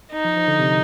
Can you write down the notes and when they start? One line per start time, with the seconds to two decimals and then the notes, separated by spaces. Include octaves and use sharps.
0.12 D#4
0.25 F3
0.37 F3
0.48 D3
0.59 C3